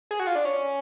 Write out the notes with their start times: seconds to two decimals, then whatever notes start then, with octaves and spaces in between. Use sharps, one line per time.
0.11 G#4
0.20 F#4
0.27 F4
0.35 D4
0.45 C#4